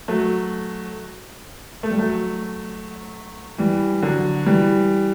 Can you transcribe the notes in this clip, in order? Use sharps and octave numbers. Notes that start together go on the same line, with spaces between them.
F#3 A3
A3
G3
F#3 A3
E3 G3
D3 F#3
E3 G3